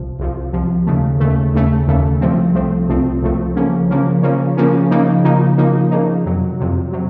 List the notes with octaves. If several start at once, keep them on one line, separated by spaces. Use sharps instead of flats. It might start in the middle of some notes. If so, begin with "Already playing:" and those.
Already playing: C2 C3 F3
C2 C3 F3
C2 C3 F3
D#2 C#3 A3
D#2 C#3 A3
D#2 C#3 A3
D#2 C#3 A3
C2 C3 F3 A3 C4
C2 C3 F3 A3 C4
C2 C3 F3 A3 C4
C2 C3 F3 A3 C4
C#3 F3 A#3 C#4
C#3 F3 A#3 C#4
C#3 F3 A#3 C#4
C#3 F3 A#3 C#4
C#3 F3 A#3 D#4
C#3 F3 A#3 D#4
C#3 F3 A#3 D#4
C#3 F3 A#3 D#4
F2 C3 F#3
F2 C3 F#3
C3 F#3